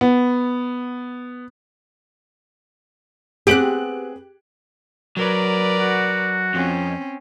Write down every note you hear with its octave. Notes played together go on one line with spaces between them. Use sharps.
B3
B3 C4 G4 G#4 F#6 D7 F#7
F#3 A#4 B4 D5
F#4
F2 C4 C#4